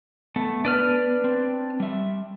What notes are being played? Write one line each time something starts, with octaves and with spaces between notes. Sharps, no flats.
A3 B3
D4 B4 F6
C4
G3 E5